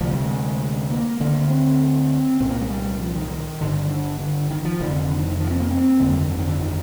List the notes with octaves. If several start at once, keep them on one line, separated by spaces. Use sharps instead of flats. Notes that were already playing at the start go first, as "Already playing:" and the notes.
D2 C3 F3
G3
G#3
A#3
D2 D3 A#3
C4
C2 A#2 C4
A#3
G#3
G3
F3
D#3
G1 G2 D3
D3
D3
D#3
F3
F1 F2 D3 D#3
D3
D#3
F3
C4
A#3
C4
G1 F2 D3 A#3
G3
D#3
D3
D#3
D3
D#3